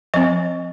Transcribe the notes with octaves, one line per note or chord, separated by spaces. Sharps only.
F3 C4 D#5